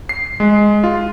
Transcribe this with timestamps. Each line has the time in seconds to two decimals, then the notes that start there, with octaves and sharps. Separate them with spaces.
0.09 C7
0.40 G#3
0.84 F4